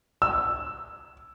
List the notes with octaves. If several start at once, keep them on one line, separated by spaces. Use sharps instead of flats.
E6